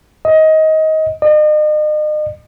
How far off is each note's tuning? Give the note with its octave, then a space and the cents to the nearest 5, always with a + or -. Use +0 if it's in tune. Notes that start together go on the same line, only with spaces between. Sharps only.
D#5 +20
D#5 -40